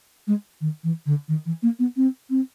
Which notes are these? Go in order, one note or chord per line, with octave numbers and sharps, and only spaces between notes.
G#3
D#3
E3
D3
D#3
E3
A#3
B3
C4
C4